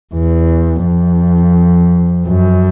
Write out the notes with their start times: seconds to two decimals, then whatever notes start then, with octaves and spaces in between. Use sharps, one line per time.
0.15 E2
0.86 F2
2.28 F#2